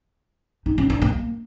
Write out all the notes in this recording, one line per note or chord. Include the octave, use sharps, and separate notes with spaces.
D#4
C#4
D4
A#3